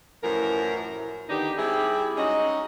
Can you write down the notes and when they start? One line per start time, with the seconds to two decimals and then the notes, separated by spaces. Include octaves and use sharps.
0.23 F#2 A2 E3 F3 A#4
1.29 D3 D#3 B3 D4 D#4 G4
1.57 G3 C4 E4 G4 G#4
2.17 G#3 C#4 D#4 F#4 D#5